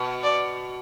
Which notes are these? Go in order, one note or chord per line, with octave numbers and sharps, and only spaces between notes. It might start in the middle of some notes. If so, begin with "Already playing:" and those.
Already playing: B2
D5